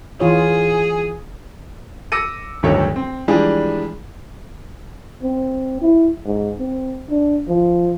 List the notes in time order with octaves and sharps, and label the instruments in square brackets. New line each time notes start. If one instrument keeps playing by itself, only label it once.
[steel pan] E3 F4 C#5 [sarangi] G#4
[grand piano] D6 E6 A#6 C#7 D#7
D1 G1 D2 D#3 A4 C#5
C4
E3 F3 G3 G#3 D4 G#4
[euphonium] C4
E4
G#2
C4
D4
F3